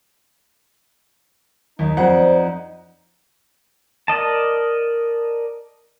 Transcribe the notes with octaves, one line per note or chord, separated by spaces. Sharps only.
D#2 D#4
F2 C5 D5 F#5
A#4 D5 D#5 A5